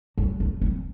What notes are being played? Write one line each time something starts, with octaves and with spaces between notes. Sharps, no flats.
F#3
B3
C4